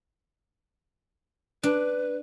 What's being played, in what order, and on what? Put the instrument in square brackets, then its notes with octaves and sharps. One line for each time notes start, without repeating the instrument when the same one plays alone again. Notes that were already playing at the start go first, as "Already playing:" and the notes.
[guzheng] D4 [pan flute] B4